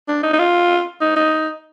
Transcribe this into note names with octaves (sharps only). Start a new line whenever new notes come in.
D4
D#4
D#4
F4
D#4
D#4